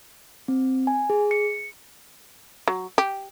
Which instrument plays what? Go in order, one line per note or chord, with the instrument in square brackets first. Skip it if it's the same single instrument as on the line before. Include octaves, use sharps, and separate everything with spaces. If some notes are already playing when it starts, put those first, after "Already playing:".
[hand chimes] C4
G#5
G#4
C#7
[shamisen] F#3
G4